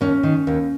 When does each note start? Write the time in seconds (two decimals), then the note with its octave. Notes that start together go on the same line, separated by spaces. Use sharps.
0.01 D#2 C#4
0.23 D#3
0.47 D#2